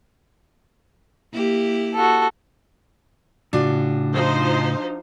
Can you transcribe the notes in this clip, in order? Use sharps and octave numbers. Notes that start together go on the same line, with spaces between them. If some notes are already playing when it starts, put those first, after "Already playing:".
A#3 E4 G4
F#4 A4
A2 C#3 D4 F4 F#4
F3 D#4 C5